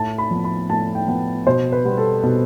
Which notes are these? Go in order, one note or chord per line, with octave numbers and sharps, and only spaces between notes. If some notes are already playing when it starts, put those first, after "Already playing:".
Already playing: A2 A5
B5
F3 B3
B5
A2 A5
G5
F3 B3
B2 C5
B4
G3 B3
A4
B2